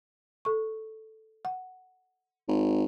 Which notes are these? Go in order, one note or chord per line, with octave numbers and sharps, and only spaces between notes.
A4 C#6
F#5
G#1